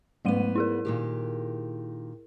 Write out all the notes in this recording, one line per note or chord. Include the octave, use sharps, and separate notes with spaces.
G#2 F#3 A3 B3 D#7
E4 G#4 A#4
A#2 D#3 G4